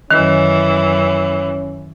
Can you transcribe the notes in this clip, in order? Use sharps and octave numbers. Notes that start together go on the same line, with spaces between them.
F#2 D#3 E3 C#4